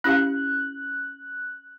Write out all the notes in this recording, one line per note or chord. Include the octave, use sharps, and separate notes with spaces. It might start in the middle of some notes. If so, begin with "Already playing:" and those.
C#4 E4 G4 F5 F#6